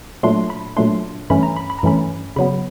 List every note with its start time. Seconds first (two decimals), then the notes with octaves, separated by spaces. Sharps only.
0.23 A#2 F#3 A3 D4 C6
0.50 B5
0.77 A#2 F#3 A3 D4 C6
1.30 G2 E3 A3 C#4 B5
1.43 A#5
1.56 B5
1.70 B5
1.79 A#5
1.83 G2 E3 A3 C#4 B5
2.36 C#3 F#3 B3 B5